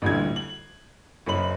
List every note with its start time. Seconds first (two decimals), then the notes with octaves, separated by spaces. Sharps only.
0.02 A1 D2 A#2 D3 G3 G#6
0.36 F#7
1.26 F#1 F#2 C#4 B5 F#7